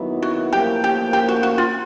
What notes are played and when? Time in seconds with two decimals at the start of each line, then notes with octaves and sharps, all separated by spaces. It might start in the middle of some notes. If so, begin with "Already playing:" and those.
Already playing: D#2 D#3 F#3 B3 E4
0.23 F#4
0.53 A2 F3 A#3 G4
0.84 G4
1.13 G4
1.28 F#4
1.43 F#4
1.58 F4